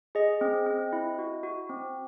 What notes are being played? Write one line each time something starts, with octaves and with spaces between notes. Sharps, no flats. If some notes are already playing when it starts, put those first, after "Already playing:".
G#4 D#5
C4
C4
E4
F#4
F#4
C4